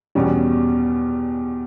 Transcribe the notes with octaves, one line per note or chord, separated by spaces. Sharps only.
E2 B2 G3 C#4